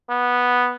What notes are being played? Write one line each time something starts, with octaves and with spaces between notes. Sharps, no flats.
B3